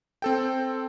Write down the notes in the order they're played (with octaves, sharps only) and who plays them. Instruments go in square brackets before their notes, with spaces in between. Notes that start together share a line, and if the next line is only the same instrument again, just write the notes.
[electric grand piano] C4 A4 G5